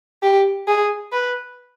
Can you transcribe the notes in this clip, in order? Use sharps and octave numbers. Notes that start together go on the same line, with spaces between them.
G4
G#4
B4